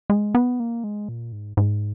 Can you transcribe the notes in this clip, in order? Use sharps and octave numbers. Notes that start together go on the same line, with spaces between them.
G#3
B3
A#3
G#3
A#2
G#2
G#2